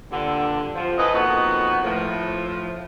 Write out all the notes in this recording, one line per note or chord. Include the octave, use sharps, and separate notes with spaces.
G2 A#2 D3
F2 F3
E3 A4 B4 D#5
F2 A#3 B3 D#4 F#4
A2 F3